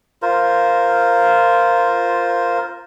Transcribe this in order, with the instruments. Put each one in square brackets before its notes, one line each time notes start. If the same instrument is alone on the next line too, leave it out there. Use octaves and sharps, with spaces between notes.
[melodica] F4 A#4 C5